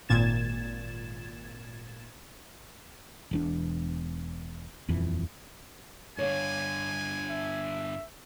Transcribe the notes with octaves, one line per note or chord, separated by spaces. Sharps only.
G#1 A#2 G#6 A6 E7
E1 E2 D4
D#1 F2 E3
G2 D3 C#5 F5 G#5
E5